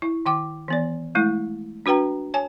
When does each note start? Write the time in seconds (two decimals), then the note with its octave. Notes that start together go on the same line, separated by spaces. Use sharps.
0.02 E4
0.26 D#3 G5 D6
0.68 E3 B3 D5
1.15 G#3 A3 E4
1.86 D4 F#4 B4 G5 A#5
2.34 C#5 G#5 A5